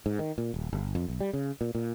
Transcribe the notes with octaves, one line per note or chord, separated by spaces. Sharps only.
G#2
D#3
A#2
D#1
G1
F2
B1
G3
C#3
A#2
A#2